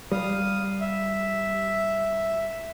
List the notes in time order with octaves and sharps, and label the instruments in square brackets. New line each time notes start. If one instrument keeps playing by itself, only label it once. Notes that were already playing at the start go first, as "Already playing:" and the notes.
[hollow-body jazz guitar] G3 [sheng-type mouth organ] F5 D#6
[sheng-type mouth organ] E5